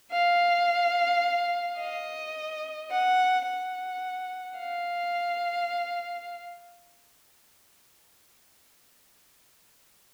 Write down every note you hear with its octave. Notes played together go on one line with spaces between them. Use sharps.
F5
D#5
F#5
F#5
F5